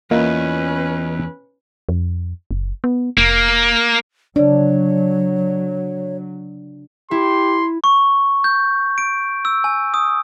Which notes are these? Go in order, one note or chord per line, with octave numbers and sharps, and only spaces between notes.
E2 A#3 C#4 F4 B4 D#5 E5
F2
F#1
B3
F1 A#3
C#3 F#3 D4 C#5 D5
E4 G4 C6
C#6
G6
D7
E6
G#5
D#6